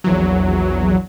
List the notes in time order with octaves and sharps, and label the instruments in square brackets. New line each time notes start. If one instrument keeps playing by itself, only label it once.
[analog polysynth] A#1 E2 F#3